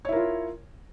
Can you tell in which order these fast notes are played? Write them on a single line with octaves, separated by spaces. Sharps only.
C#5 E4 A#4 F4